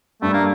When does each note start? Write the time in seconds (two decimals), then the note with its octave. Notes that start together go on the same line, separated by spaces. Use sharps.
0.22 G2 A3
0.33 A#3